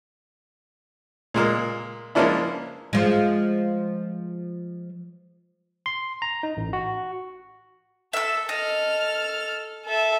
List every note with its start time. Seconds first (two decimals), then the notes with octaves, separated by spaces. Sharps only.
1.34 A#2 G#3 A#3
2.15 F3 G#3 A#3 C#4 D4 E4
2.93 F3 G#3
5.86 C6
6.22 A#5
6.43 D#4
6.57 A1
6.73 F#4
8.13 A4 E5 E6
8.49 A4 D#5 F6
9.86 A4 E5